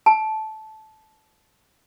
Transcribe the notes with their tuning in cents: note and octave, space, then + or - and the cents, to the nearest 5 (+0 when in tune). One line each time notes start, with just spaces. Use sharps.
A5 -15